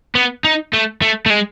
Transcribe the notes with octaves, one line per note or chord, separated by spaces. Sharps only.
B3
D#4
A3
A3
A3
G#3